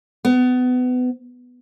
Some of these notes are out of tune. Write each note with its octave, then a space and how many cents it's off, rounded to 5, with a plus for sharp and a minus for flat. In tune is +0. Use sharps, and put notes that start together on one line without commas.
B3 +25